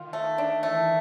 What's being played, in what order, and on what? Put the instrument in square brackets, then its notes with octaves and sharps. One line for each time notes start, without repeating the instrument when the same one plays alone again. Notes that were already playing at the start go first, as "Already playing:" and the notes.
Already playing: [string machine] D#3 [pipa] F4
[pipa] A3
D4
[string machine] E3 [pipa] A3